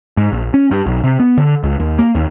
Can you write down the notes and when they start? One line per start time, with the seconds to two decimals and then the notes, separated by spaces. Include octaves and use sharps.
0.17 G#2
0.32 A#1
0.54 C#4
0.71 G2
0.86 B1
1.04 C3
1.19 B3
1.37 D3
1.63 C#2
1.80 D#2
1.99 A#3
2.15 D#2